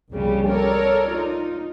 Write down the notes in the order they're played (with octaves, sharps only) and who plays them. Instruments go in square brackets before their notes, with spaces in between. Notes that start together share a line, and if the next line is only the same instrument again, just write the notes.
[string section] C2 F2 A#2 C#3 G3
A4 A#4 C#5 D5
D#4 F4